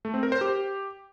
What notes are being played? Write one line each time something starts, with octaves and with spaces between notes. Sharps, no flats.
A3
C4
A#4
C5
G4